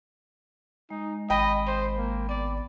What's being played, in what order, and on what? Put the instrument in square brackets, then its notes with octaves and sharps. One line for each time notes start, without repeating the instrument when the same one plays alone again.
[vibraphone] G#3 [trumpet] D#4
[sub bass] G#1 [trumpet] D#5 [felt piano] G5 B5
[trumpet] C5
A#3
[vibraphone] B3 [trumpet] D5